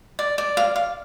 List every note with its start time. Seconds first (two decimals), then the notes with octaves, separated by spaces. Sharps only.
0.19 D5
0.38 D5
0.57 F5
0.76 F5